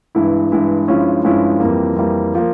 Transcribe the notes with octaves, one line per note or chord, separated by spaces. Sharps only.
G2 E3 G#3 E4
G2 E3 G#3 E4
G2 F3 G#3 C#4 E4
G2 F3 G#3 C#4 E4
F2 E3 G3 A#3
F2 E3 G3 A#3
F3 A#3